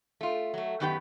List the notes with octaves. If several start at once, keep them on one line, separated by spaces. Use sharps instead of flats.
A3 F4
F#3 A3
F#2 D#3 B3 G4 B4 G5